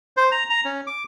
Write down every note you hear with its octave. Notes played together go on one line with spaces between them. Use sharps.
C5
A#5
A#5
C#4
D6